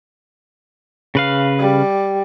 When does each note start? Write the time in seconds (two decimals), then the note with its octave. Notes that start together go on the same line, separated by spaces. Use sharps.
1.15 C#3 B4 F5
1.59 G3